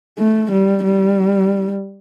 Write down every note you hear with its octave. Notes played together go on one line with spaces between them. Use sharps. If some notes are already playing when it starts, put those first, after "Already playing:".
A3
G3
G3